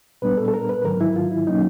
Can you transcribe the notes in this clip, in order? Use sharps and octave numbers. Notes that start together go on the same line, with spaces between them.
A#2 G3 B3 D4 B4
A4
A4
A#4
B4
G#2 D#3 F#3 A#4
E4
F4
E4
B2 F#3 A#3 C#4 D#4